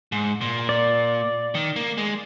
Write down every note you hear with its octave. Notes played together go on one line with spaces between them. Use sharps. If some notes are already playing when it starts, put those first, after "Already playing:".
G#2
A#2
D5
D#3
A#3
G#3